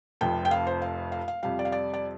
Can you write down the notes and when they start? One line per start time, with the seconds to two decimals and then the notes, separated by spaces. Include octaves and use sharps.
0.21 F1 F2 C3 F3 G5
0.45 G5
0.51 F5
0.67 C5
0.82 F5
1.12 F5
1.28 F5
1.43 F2 C3 G3 F5
1.59 D5
1.65 F5
1.72 D5
1.94 D5